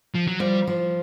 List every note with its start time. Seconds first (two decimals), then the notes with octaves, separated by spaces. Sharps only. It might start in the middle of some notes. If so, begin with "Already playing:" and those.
0.15 F3
0.27 F#3
0.40 F3 G3
0.67 F3